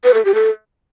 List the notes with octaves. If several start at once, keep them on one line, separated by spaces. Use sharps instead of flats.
B4
A4
G4
A4